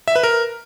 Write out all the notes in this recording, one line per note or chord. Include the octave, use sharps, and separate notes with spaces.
E5
B4
A#4